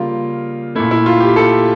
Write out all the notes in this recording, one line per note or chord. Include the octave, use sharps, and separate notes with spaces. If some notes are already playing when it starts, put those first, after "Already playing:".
Already playing: C#3 G3 A#3 F4
A#2 A3 E4
E4
F4
G4
A4